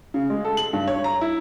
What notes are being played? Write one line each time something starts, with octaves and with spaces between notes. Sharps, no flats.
C#3
G#3
A4
F#7
G2
C#5
A#5
E4